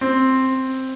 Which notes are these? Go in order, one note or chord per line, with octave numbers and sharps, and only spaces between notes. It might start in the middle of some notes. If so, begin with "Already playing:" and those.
C4